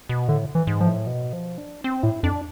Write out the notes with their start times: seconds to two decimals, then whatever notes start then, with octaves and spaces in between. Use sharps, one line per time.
0.09 B2
0.28 A2 D3
0.55 E3
0.67 G#2
0.80 F3
0.86 A2
1.07 B2
1.33 F3
1.58 D4
1.84 C4
2.03 A2 E4
2.23 F2 D4